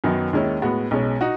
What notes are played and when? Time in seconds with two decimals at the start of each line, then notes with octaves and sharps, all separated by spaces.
0.04 F#2 D#3 F#3 B3
0.33 D#2 D#3 G#3 C#4 E4
0.62 A2 G#3 B3 F#4
0.91 B1 B2 G#3 C#4
1.21 D#4 F#4